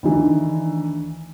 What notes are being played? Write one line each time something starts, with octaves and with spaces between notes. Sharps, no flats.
D2 D#3 E3